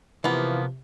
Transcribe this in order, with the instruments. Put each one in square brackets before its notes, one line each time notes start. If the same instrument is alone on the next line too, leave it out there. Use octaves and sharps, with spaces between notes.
[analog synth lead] C3 [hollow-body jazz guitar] E3 [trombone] F3 [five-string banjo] A#3 B3